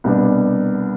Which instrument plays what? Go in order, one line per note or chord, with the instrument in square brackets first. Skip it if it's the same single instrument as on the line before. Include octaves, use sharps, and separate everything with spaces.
[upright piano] C2 B2 G3 B3 D4